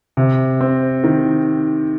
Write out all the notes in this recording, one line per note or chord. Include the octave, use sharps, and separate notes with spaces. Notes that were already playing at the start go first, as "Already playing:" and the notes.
C3
C4
D#3